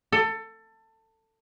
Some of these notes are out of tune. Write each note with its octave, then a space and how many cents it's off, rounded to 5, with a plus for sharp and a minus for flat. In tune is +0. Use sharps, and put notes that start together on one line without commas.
A4 +20